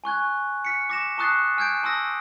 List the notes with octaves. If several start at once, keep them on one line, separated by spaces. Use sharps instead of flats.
G#5 C#6 F#6 G#6
F6 B6 C#7
D6 A#6 E7
A5 C#6 D#6 F#6 A6 C7
G#5 F6 G6 G#6 D7
A5 C6 D#6 E6 A#6